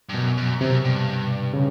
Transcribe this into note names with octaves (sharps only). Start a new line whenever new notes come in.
G2
F#2 B2
F#2
F#2 C3
G2
C#3